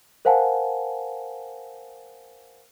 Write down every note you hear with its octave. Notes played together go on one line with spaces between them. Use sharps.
A#4 C5 F5 F#5 G#5 A5